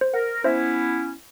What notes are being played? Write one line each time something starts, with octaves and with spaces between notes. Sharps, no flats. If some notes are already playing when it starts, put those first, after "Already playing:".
C5
A#4 F#5
B3 C#4 E4 C5 E5